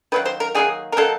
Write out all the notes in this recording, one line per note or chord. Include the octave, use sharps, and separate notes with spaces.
D#3 F#3 A#3 B4
C5
A#4
D#3 F#3 A#3 G#4
A#4
D#3 F#3 A#3 A4